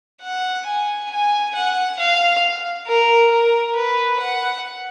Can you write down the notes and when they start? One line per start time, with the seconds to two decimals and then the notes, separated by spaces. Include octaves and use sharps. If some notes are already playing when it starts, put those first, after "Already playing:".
0.22 F#5
0.66 G#5
1.11 G#5
1.55 F#5
1.99 F5
2.87 A#4
3.31 A#4
3.76 B4
4.20 F#5